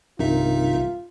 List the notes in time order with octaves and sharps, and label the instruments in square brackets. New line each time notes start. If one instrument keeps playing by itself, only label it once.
[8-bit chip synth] B1 D#4 E5 [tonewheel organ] G2 C3 D#3 [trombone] F4